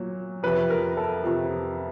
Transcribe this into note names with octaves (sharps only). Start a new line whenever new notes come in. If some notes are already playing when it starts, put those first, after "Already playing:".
Already playing: A#2 F#3
F2 C3 F3 B4
A#4
A4
F2 C3 F3